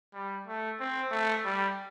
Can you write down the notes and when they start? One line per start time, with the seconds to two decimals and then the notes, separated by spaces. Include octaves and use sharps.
0.14 G3
0.47 A3
0.80 C4
1.11 A3
1.45 G3